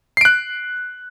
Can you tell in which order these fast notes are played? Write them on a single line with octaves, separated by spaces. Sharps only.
C7 D7 F#6